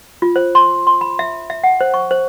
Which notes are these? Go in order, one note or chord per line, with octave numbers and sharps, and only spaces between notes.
F4
C5
C6
C6
B5
E5
E5
F#5
C5
C#6
C5